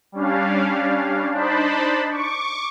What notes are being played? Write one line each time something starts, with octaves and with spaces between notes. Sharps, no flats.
G3 C#4 D4 F5
D4 D#4 C5 A5 B5
C#6 D6